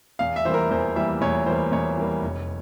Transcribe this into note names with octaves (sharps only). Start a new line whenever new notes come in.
E2 F5
E5
E3 G3 A#3 C5
A#4
E2 C5
E3 G3 A#3 E5
E2 C#5
E3 G3 A#3 C5
E2 C#5
E3 G3 A#3
F1